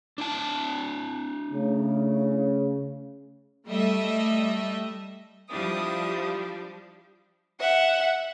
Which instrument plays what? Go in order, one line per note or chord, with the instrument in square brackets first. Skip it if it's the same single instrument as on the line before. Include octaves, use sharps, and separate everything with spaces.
[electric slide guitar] D4 E4 A5
[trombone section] C#3 [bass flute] A3
[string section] G3 A3 D#5 E5
[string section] F3 G3 D4 [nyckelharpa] E4 D#6
[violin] E5 F#5